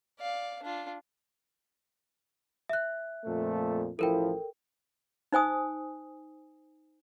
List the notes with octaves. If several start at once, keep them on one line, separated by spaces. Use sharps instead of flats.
D5 F5
D4 F4
E5 F#6
F2 A#2 A3
A1 F3 E4 A4 A#4 G5
D#4 C5 G#5 D#6